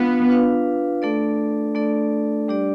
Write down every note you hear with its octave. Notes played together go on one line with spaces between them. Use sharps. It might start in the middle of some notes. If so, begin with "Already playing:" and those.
Already playing: B3 D4 F4 B4 F5
D4 F4 B4 F5
A3 D4 A4 D5
A3 D4 A4 D5
G3 D4 G4 D5